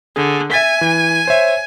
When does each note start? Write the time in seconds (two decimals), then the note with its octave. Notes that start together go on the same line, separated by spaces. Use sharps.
0.16 D3 G#4
0.52 E5 G#5 A6 B6
0.81 E3
1.27 C5 C#5 E5